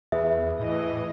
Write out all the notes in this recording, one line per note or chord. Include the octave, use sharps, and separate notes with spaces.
E2 G#4 B4 E5
A2 E3 D#5